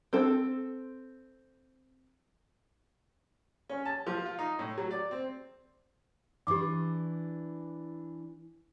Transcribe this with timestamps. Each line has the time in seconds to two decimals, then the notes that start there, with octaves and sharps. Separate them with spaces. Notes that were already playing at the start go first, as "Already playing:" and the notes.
0.13 C4 A4
3.70 C#4
3.85 A5
4.06 F3
4.25 F4
4.39 D#4
4.59 A2
4.78 F#3
4.91 D5
5.11 C4
6.47 E3 D4 G4 D6